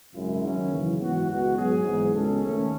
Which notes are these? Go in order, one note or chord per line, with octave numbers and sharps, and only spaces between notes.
G#1 F#2 C#3 G#3 E4
D#2 D#3 F#3 C#4
F#2 C#3 E3
G#2 E3 B3 F#4
C#2 B2 G#3 B3 F#4
G#2 F#3 B3 G#4
G#1 G#2 E3
C#2 B2 G#3 C#4 A4
D#2 D#3 A3 C#4